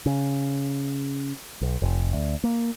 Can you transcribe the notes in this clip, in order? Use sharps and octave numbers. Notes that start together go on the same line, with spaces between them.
C#3
B1
F1
D2
A#3